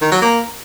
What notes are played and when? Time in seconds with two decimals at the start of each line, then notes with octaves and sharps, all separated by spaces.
0.01 D#3
0.11 F#3
0.22 A#3